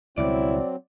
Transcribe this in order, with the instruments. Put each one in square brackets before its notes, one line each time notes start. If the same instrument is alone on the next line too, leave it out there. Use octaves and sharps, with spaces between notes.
[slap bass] C#2 B2 G3 [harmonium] F#3 C4 [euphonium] E4 [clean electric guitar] D5